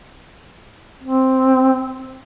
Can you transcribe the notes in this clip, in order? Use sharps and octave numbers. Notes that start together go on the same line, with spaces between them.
C4